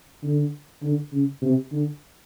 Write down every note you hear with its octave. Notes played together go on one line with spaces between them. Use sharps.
D3
D3
C#3
C3
D3